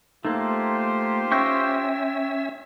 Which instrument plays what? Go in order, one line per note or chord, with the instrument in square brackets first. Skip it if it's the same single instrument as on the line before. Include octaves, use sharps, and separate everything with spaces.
[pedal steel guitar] A3 A#3 [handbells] D#4 [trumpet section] F4 G4 C5
[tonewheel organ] C#4 E5 [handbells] G5 E6 A#6 [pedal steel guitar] C#6 G6